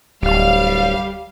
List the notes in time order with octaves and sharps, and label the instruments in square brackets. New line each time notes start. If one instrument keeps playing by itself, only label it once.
[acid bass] D1 [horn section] G3 [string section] F5